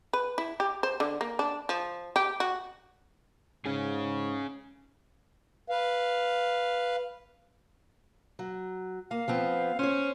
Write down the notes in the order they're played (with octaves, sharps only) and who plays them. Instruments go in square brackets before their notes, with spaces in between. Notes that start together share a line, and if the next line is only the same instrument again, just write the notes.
[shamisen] B4
E4
G4
C5
D3
A#3
D4
F3
G4
F#4
[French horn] G#2 [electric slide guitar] C#4 G#4
[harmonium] B4 F5
[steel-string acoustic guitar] F#3
[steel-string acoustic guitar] A#3 [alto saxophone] F5
[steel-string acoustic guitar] F3 B3 C4
[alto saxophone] C#4 [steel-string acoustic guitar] C5 C#5